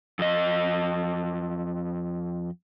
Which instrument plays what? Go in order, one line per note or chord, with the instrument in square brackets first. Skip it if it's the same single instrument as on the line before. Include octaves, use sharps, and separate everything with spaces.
[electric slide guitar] F2 D#5